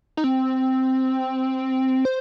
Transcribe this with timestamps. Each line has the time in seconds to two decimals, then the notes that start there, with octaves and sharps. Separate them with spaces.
0.17 D#4
0.24 C4
2.05 C5